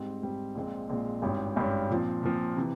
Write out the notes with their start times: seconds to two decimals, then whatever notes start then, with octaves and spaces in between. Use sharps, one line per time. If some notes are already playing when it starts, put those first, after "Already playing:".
Already playing: G#2 G3 C4
0.22 G#2 G3 C4
0.55 A#1 A#2 G#3 C4
0.89 A#1 A#2 G#3 C4
1.22 G#1 G2 G3 C#4
1.56 G#1 G2 G3 C#4
1.90 A#2 F3 C4
2.23 A#2 F3 C4
2.57 C3 E3